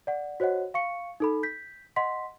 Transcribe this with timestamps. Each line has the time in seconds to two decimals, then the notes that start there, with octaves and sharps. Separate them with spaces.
0.07 D5 F#5
0.40 F#4 C5 C#5 D#5 F#5
0.74 F5 C#6 C#7
1.20 D#4 A4 B5
1.43 G6 B6
1.96 D#5 F#5 C6 B6